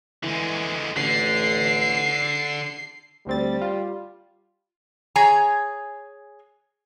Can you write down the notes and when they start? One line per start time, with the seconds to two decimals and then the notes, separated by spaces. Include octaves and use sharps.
0.23 D3 E3 G#3
0.96 A1 D3 C7
3.27 D2 G3 C4 A6
3.62 F4
5.16 G#4 C#5 G#5 A#5